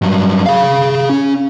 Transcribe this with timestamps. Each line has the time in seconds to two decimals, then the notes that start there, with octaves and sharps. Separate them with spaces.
0.02 G2 F#3
0.46 G#4 F5
1.09 C#4